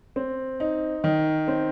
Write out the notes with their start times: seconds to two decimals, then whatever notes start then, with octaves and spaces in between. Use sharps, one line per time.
0.16 C4
0.60 D#4
1.04 D#3
1.48 C4